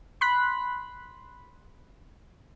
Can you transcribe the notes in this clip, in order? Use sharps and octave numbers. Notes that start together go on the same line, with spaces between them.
B5 C6 F#6 B6